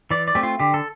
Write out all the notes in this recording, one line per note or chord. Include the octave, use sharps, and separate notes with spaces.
E3 D5
D5
A3 C4 G4
F4
D3 G4
A4